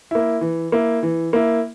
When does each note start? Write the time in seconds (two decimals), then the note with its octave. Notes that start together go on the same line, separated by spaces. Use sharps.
0.11 A#3 E4
0.41 E3
0.72 A#3 E4
1.03 E3
1.33 A#3 E4